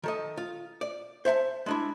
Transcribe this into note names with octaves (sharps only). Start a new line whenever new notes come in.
D#3 A4 D#5
F4
D5
C5 E5 F#5 A5
G#3 D4 E4